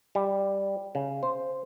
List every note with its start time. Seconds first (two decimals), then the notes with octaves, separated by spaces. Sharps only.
0.15 G3
0.95 C#3
1.23 C5